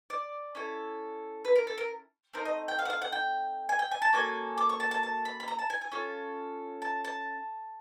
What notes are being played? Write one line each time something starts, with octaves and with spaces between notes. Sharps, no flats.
D5
C#4 E4 A4
B4
A#4
A4
A#4
A3 C4 D#4 A#4
D#5
G5
F5
F#5
F5
F#5
G5
G#5
G5
G#5
A5
A#3 C#4 F#4 A4 G#5
D6
C#6
A5
A5
A5
B5
B5
A#5
A5
G#5
G#5
C#4 F4 A4
A5
A5